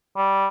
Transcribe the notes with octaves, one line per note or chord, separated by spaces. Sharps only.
G3